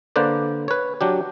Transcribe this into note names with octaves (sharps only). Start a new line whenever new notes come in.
D3 A#3 B4 C5 D5
B4 C#5
F#3 D4 G4